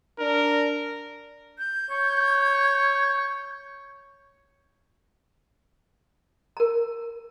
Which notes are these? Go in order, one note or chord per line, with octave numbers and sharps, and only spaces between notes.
D4 A#4
G6
C#5
A#4 A#5